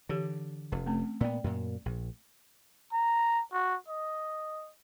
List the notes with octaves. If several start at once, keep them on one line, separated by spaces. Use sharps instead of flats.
D3 E3 G4
F1 C#4
A3 C4 C#4
A#2 B3 D5 G5
F#2 A#2
A#1
A#5
F#4
D#5